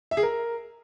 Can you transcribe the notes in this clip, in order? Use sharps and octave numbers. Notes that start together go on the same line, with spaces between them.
E5
G#4
A#4